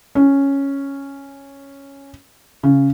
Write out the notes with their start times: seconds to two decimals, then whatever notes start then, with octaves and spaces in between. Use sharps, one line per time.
0.15 C#4
2.63 C#3